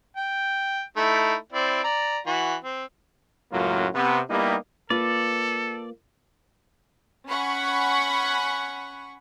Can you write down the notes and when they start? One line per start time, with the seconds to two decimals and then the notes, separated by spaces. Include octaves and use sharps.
0.17 G5
0.97 A3 D#4 E4
1.53 C4 E4 D5
1.84 D5 A#5
2.27 E3 F#4
2.64 C4
3.52 C#2 F#2 A2 F#3 A#3 F4
3.95 C3 B3
4.30 G3 A#3 B3 D#4 E4 G4
4.90 A#3 F4 A4 B4 D5
7.28 C#4 F#5 B5 C#6